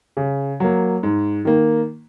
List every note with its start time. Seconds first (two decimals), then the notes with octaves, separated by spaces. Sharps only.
0.17 C#3
0.60 F#3 A#3
1.03 G#2
1.45 D#3 A#3